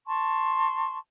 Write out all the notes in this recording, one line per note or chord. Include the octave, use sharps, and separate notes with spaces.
A5 C6 C#6